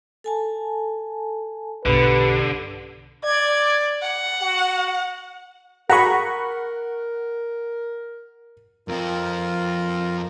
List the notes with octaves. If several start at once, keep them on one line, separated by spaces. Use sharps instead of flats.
A4 G#5 A5
B1 G2 B2 D3 G4 B4
D5 G#6
F#5
F#4
F#4 G#4 A#4 F#5 A#5 B5 C#6
F2 C4 F4 A#4